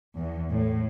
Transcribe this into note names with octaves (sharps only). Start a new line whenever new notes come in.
E2
A2